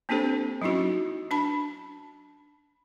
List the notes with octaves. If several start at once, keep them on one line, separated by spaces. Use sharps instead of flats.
A#3 C4 D4 G4 A4 C5
F#3 C#4 D#4 E4 F#4
D4 A5 B5